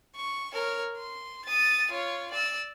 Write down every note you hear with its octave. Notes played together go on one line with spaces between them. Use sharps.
C#6
A#4 C#5
C6
D#6 A6
F4 C#5
D5 E6